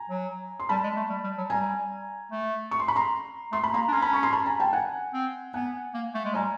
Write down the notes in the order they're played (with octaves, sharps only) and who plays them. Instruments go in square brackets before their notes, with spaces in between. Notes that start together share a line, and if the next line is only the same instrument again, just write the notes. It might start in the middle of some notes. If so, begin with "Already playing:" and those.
Already playing: [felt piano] G#5 A#5
[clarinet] F#3
[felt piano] C6
[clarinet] G3 [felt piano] A5 B5
[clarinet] G#3
A3
G3
G3
F#3
[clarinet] G3 [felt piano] G#5 A#5
[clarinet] A3
[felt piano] C#6
C6
B5
A#5 C6
[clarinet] A3 [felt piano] C6
[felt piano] B5
[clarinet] A#3 [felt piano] A#5 C6
[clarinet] D4
[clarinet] C#4 [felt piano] A#5 C6
[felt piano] A5 B5
B5 C#6
A#5 C6
A5 B5
G#5 A#5
G5 A5
F#5 G#5
[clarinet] C4
[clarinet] B3 [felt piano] F#5 G#5
[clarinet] A#3
A3
G#3
[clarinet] G3 [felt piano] G#5 A#5